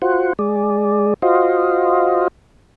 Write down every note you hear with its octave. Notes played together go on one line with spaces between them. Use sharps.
F4 F#4 C5 F#5
G#3 G#4 D5
F4 F#4 C5 D#5 F5